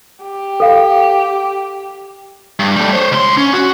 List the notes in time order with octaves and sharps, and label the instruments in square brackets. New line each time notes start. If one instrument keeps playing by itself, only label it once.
[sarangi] G4
[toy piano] A4 F5
[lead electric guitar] G2
G3 A3
C5 C#5
C#2 C6
C#4
F#4